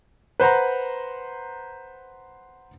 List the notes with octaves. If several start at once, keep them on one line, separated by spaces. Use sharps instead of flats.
B4 C5 F#5 A#5